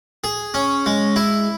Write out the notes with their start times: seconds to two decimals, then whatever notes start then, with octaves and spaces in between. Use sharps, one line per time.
0.24 G#4
0.54 C#4
0.86 G#3
1.16 E4